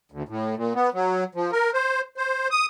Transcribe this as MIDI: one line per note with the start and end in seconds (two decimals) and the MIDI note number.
0.12 0.23 38
0.29 0.55 45
0.56 0.73 46
0.75 0.89 59
0.94 1.24 54
1.35 1.51 53
1.52 1.71 70
1.74 2.01 72
2.17 2.48 72
2.51 2.66 87